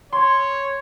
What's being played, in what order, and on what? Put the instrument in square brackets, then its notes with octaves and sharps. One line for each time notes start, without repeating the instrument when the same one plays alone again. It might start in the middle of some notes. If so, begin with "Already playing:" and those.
[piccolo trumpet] C#5 [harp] C6